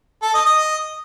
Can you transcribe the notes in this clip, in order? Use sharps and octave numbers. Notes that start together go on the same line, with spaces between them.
A4
D#5
D#5